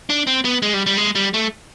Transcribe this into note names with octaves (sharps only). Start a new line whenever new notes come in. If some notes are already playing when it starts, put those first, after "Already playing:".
D4
C4
B3
G#3
G3
G3
G#3
G3
A3